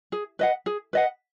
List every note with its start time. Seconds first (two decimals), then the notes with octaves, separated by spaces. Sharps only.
0.12 G#4
0.39 B4 D#5 F#5
0.66 G#4
0.93 B4 D#5 F#5